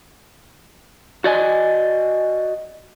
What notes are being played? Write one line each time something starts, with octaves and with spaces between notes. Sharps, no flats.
F#4 D5 D#5 G#5